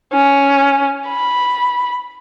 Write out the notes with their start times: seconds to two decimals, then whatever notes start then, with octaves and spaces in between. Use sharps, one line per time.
0.13 C#4
1.08 B5